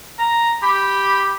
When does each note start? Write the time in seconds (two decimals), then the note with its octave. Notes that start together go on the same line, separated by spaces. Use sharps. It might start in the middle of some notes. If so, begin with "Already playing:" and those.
0.19 A#5
0.63 G4 B5